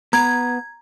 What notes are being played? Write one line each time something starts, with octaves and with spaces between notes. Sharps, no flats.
B3 A#5 G#6